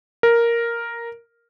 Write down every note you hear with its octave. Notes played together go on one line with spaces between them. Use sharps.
A#4